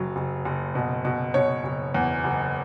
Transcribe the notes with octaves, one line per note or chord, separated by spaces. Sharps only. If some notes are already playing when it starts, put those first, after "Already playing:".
Already playing: F#1 F#3
F#1
F#1
B2
B2
B2 C#5
F#1
E2
F#1